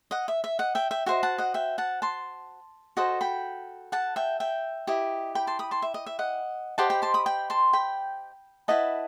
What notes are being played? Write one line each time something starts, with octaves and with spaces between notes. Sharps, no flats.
D#5 F#5
E5
E5
D#5 F#5
E5 G5
E5 G5
F#4 C5 D#5 E5 G5
F#5 A5
D#5 F#5
E5 G5
F#5 A5
A5 C6
F#4 A4 C5 D#5
G5 B5
F#5 A5
E5 G5
E5 G5
E4 G4 D#5
G5 B5
A5 C6
B5 D#6
A5 C6
E5
D#5
E5
D#5 F#5
G4 C5 D#5 F#5 A5
G5 B5
A5 C6
B5 D#6
G5 B5
A5 C6
G5 B5
E4 B4 D#5 F#5 A5